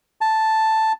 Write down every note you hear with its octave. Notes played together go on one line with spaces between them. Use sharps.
A5